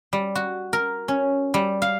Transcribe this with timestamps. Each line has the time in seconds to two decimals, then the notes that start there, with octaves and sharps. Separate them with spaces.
0.13 G3
0.35 F#4
0.73 A#4
1.08 C#4
1.54 G3
1.82 F5